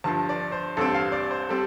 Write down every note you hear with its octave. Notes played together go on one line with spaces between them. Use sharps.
G1 G2 F3 A5
D5
C5
A1 G2 G3 C4 A4
F5
D5
C5
G3 C4 A4